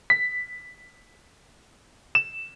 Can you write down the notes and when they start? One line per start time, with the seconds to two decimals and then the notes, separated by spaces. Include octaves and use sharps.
0.10 B6
2.15 E7